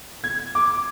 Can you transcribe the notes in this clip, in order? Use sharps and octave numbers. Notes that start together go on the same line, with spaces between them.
G#6
D6